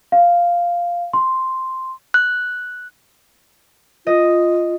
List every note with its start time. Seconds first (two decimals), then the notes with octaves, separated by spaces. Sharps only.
0.12 F5
1.13 C6
2.14 F#6
4.07 F4 D#5